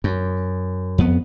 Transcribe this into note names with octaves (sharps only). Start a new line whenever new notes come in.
F#2
F2 B3